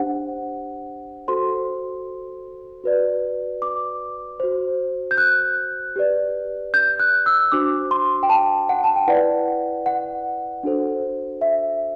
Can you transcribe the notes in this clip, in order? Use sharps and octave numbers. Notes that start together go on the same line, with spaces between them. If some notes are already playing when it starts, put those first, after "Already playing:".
Already playing: D4 G4 C5 F#5
F#4 A4 C5 C6
F#4 B4 D5
D6
F#4 C5
G6
F#6
G4 B4 D5
G6
F#6
E6
D4 F#4 C5 D6
C6
G5
A5
F#5
A5
G5
E4 B4 D5 F#5
F#5
D4 F#4 A4 C5
E5